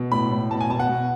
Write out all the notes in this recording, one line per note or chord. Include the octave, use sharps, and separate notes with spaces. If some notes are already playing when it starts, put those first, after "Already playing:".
Already playing: B2
A2 B5
A2
B2 A5
G#5
B2 A5
F#5
B2